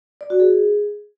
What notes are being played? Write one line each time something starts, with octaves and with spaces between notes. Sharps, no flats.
D5
F#4
G#4